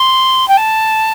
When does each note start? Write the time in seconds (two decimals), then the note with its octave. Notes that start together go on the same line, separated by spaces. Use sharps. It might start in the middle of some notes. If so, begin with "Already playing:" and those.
Already playing: C6
0.48 G5
0.57 A5